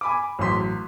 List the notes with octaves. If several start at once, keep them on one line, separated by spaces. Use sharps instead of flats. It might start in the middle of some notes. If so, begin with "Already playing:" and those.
G#5 B5 D6
A1 F#3 C6 B6